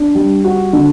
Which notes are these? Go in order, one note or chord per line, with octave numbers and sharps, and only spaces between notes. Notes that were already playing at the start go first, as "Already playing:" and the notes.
Already playing: D4
G3
F#4
D3